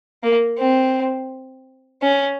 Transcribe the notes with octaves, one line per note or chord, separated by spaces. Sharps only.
A#3
C4
C#4